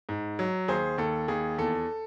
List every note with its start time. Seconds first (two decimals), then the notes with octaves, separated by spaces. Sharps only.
0.09 G#2
0.39 F#3
0.68 D#2 G#4 C5
0.98 D#2 A4
1.28 D#2 G#4
1.58 E2 A4